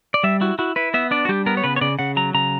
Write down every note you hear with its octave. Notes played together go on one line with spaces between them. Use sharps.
D5
G3 E5
E4 F#4
E4 F#4
E4 B4
B3 E5
D4 D5
F#4
G3 G4
B3 A#4
C#5
C#3 B4
C#5
C#3 D5
C#3 F#5
F#3 A#5
C#3 A#5